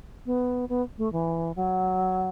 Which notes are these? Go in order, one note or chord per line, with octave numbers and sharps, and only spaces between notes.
B3
B3
A3
E3
F#3